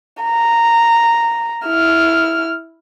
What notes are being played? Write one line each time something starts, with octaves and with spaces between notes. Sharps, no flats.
A#5
E4 F6